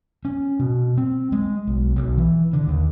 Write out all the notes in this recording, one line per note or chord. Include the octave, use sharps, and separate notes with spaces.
C#4
B2
C4
G#3
B1
B1
E3
D3
D#2